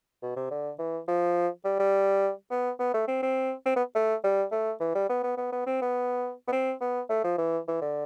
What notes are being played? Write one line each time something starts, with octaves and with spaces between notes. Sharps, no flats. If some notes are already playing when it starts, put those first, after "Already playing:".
B2
C3
D3
E3
F3
G3
G3
B3
B3
A3
C4
C4
C4
B3
A3
G3
A3
E3
G3
B3
B3
B3
B3
C4
B3
B3
C4
B3
A3
F3
E3
E3
D3